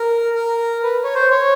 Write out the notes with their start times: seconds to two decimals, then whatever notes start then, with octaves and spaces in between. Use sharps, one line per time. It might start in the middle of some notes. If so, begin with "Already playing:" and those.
Already playing: A#4
0.35 A#4
0.83 B4
1.04 C#5
1.15 C5
1.31 C#5